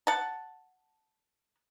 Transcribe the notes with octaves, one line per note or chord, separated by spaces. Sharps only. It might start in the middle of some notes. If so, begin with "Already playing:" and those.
F#5 A5